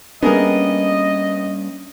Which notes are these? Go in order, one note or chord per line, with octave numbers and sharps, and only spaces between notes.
G3 A#3 B3 C#4 D4 G#4 A#4 D#5